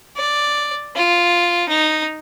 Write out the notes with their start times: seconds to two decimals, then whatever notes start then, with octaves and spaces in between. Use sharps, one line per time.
0.17 D5
0.96 F4
1.69 D#4